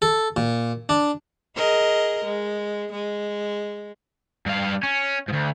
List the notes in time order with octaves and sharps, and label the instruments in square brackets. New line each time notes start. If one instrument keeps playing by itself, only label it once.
[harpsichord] A4
A#2
D4
[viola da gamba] G#4 A#4 D#5
G#3
G#3
[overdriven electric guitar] G2 F5
C#4
D2 G#2